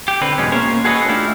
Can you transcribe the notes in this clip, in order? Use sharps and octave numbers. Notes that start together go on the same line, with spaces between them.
G4
D3 C4 B4
E2 B2 G#3 C#4
A#3 C#4 C5 C#5
F#4 G#4 A4 B4 C#5 D#5
A3 D4 E4 F4 G4